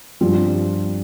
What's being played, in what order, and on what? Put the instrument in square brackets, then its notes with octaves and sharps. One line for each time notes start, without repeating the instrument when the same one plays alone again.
[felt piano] G2 F3 C4 F4